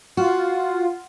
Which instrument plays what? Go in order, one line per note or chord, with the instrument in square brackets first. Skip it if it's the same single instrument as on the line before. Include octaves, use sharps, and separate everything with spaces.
[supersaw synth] F4 [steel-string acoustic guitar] F#4